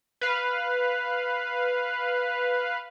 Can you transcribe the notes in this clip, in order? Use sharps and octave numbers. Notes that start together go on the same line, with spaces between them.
B4 F5